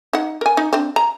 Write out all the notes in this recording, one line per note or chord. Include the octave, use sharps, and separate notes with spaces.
D#4 F#5
A#4 G#5
D#4
C4 D4
A#5